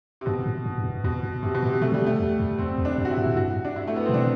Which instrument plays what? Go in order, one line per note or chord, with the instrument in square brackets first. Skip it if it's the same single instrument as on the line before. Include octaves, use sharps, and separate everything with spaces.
[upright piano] C3
[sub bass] G2 [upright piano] B2
[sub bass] A2
G2
G2
F#2
[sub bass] E2 [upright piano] B2
[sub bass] F#2
[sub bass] G2 [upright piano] C3
[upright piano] B2
[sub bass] A2
[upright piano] C3
[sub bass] B2 [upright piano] A3
[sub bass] B2 [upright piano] G3
[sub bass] C3
[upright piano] A3
[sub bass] E2
F#2
[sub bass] E2 [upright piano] C4
[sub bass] E2
[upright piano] D4
[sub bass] F#2
[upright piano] F#4
E4
[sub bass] G2
A2
[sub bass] G2 [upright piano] F#4
[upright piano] D4
E4
A3
B3
[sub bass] A2 [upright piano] C4
[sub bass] B2 [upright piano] D4